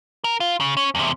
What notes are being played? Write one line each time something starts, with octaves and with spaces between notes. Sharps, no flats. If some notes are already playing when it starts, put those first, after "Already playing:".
A#4
F4
C#3
C#4
E2 C3